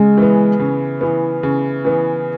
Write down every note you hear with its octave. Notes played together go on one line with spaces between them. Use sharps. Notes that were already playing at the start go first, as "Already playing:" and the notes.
Already playing: C#3 G#3
E3 B3
C#3
E3 B3
C#3
E3 B3